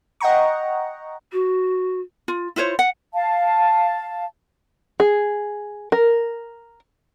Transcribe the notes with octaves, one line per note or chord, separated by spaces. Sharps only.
D#5 F#5 G5 A#5 C#6
F#4
F4
E4 F4 C5 C#5
F#5
F5 A5
G#4
A#4